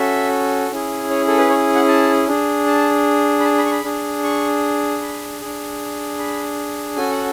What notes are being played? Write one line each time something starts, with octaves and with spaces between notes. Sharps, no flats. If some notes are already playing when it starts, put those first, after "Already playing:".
Already playing: C#4 F#4 A4 E5
C#4 E4 G#4
C#5
A4
B4
C#5
F#5
A5
D4 G#4
A5
B5
A5
B5
C#6
B5
D4 G#4
C#6
B5
D4 G#4
B5
C#4 F#4 A4 G#5
F#5